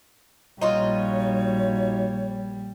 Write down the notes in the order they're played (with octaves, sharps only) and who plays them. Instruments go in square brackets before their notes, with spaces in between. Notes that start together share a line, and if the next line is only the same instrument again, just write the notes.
[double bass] A#1 G3 [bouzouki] D#4 F4 F#4 [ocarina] C#5